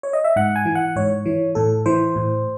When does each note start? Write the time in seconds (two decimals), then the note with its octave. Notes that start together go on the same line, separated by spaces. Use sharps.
0.03 C#5
0.13 D#5
0.24 E5
0.36 G#2 F#5
0.56 G#5
0.65 E3
0.75 F#5
0.96 G#2 C#5
1.26 E3
1.55 A2 A4
1.86 E3 C5
2.16 A2